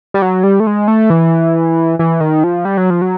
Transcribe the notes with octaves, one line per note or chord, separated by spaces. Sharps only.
G3
F#3
G3
A3
G#3
A3
E3
E3
D#3
F3
G3
F#3
F3
F#3